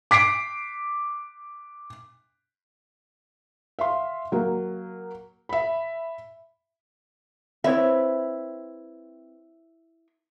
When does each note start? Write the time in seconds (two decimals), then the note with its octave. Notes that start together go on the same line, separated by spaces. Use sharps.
0.11 D6 B6 C7 D7
3.79 E5 F5 C6
4.32 F#3 A#3
5.49 E5 B5
7.64 C4 E4 B4 C#5 E5